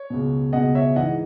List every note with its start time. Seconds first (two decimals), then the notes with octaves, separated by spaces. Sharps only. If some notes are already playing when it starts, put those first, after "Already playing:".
Already playing: C#5
0.10 C#2 B2
0.53 C#2 B2 D#5 F#5
0.75 C#5 E5
0.96 G#2 E3 D#5 F#5